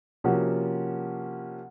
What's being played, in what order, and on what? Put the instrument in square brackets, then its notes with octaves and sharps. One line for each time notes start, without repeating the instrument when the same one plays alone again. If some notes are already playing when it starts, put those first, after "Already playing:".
[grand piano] C3 F3 A#3 C#4 F#4